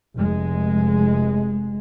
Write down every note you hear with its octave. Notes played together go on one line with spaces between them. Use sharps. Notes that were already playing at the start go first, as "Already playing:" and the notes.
F1 G#3